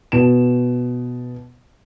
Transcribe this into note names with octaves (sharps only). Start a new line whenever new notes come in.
B2 E7